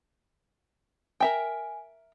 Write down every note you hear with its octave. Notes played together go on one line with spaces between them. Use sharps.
A#4 E5 G5 G#5